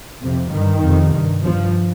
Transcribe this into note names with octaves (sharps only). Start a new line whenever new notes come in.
F2 C3
G2 D#3
F2 C3
G2
G2 F3